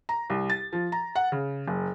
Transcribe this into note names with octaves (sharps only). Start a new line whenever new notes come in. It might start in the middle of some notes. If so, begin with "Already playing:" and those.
A#5
C2
A6
F3
A#5
F#5
C#3
F#1